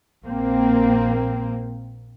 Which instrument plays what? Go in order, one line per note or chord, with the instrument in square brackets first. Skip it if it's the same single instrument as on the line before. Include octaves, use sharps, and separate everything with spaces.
[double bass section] A#1 A#3 C4